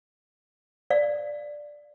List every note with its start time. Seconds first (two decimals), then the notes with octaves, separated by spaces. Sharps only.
0.90 D5 F5